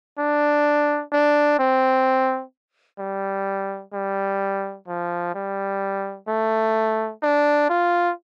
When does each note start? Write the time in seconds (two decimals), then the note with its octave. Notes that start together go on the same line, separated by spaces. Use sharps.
0.18 D4
1.12 D4
1.59 C4
2.99 G3
3.93 G3
4.88 F3
5.34 G3
6.28 A3
7.22 D4
7.69 F4